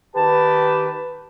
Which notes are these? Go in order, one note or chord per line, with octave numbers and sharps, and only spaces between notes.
D#3 G4 B4 A5